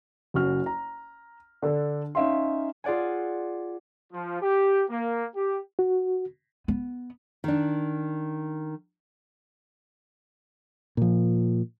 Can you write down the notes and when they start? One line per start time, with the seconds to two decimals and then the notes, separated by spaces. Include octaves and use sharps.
0.34 F#1 C#4 F#4 F6
0.66 A#5
1.62 D3 D4 A4
2.15 C#4 D#4 E5 F5 C6
2.84 F4 G#4 D5 F#5 G#5
4.13 F3
4.41 G4
4.90 A#3
5.36 G4
5.79 F#4
6.68 B3
7.44 D#3 D4
10.97 A#2 F3